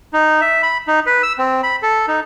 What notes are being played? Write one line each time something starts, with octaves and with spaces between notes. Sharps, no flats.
D#4
E5
B5
D#4
B4
E6
C4
B5
A4
D#4